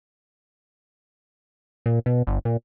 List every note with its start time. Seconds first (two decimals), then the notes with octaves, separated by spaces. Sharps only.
1.86 A#2
2.06 B2
2.27 G1
2.45 A#2